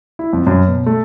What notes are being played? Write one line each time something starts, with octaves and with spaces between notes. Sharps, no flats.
E4
F2
F#2
B2
A3